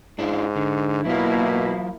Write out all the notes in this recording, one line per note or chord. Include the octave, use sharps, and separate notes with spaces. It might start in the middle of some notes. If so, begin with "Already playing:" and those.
G#2 D4 E4 F4
D3
B2 F#3 A#3 E4 F4